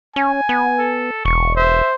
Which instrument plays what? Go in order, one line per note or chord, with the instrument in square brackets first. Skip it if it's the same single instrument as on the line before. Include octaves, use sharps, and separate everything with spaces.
[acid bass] C#4 [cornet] G#5
[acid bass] B3
[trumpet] A4
[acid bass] E1 [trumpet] C#6
[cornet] C5 [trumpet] E5